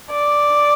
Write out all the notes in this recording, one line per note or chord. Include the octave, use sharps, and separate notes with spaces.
D5